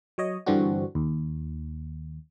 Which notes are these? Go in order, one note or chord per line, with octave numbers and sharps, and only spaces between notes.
F#3 C#5 D#5
G2 D3 E3 C4 D4 F#4
D#2